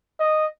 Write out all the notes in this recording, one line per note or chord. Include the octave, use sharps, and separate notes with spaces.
D#5